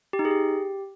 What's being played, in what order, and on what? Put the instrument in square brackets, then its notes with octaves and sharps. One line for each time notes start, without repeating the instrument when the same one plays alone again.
[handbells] G4
D#4
G#4
G4